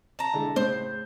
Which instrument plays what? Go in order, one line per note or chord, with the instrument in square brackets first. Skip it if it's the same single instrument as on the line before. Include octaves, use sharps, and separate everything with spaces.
[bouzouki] A5 A#5
[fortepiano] D3 G#3 E4
[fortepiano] A2 C#3 [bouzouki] C5